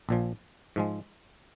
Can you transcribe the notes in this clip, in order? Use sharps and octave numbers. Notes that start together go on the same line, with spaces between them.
A#1 A#2 F3
G#2 F3 G#3